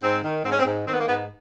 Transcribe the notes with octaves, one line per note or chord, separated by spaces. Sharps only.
G#2 C4
D#3
G#2 C4
C#4
C4
G#2
D#3 C4
B3
A#3
G#2 B3